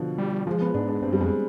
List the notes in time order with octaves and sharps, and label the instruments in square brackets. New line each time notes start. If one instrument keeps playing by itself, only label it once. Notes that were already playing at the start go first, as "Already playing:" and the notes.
Already playing: [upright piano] B2 D3 F3
[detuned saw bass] G3
[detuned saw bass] F3 [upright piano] G#3
[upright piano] B3
[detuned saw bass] G#2 [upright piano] D4
[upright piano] D4
[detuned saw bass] G2 [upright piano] C4
[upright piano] G3
[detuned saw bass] F2 [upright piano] G#3